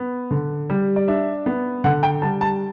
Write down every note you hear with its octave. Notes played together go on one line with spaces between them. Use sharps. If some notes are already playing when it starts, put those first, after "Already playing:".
Already playing: B3
D3
G3
D5
D4 E5
B3
D3 F#5
G5
G3 A5
A5